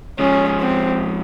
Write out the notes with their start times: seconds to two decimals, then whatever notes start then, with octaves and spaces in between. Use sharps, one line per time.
0.19 F3 G#3 C#4
0.61 C4